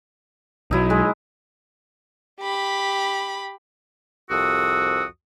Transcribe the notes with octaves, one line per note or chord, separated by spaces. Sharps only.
B1 F#3 D#4 E4
G#3
G4 B5
C2 F2 F#4 D#6 E6